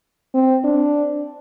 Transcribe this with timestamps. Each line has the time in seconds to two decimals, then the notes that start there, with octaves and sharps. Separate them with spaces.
0.35 C4
0.64 D4